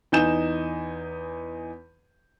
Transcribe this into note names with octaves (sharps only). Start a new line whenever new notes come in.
E2 D#4 G#5 G6 E7